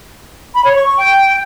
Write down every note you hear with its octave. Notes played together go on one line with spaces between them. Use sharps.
B5
C#5
C#6
C#6
G5